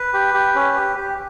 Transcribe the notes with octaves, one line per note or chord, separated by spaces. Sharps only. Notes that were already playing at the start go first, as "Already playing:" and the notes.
Already playing: B4
G4
G4
C#4
G4
G4